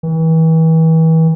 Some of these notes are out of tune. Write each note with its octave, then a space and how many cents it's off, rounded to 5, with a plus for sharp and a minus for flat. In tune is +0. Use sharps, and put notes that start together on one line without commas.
E3 -35